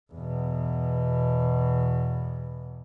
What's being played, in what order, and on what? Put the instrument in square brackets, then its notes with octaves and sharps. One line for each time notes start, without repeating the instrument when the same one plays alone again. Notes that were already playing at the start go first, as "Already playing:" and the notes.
[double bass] E2 B2